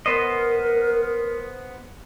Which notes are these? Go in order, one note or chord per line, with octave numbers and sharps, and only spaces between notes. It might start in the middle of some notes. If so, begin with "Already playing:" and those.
B3 A#4 C5 D#5